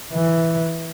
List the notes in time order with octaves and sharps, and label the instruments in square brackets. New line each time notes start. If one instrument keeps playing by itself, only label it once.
[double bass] E3